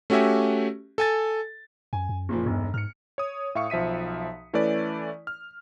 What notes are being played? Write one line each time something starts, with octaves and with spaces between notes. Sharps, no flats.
A3 C#4 F#4 G4 E5 G#5
A4 G#5 A6
F#2 G#5
F#2
F#1 A#2 F3
E1 B1 G2
G#2 F6 C#7
C#5 D#6
A2 E5 F5 C#6 C#7
B1 F3 E5 B6 D#7
E3 A3 C#4 E4 B4 D5
F6